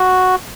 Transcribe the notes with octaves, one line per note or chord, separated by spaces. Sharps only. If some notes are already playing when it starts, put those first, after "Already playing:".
Already playing: F#4